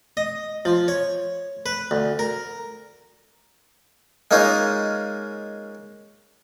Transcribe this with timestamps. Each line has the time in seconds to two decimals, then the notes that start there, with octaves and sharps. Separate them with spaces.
0.17 D#5
0.65 F3
0.88 C#5
1.66 B4
1.91 D2
2.19 A#4
4.31 G#3 A#3 C#4 D#4 F4